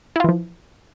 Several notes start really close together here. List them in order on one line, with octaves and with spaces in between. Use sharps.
E4 F4 E3 F3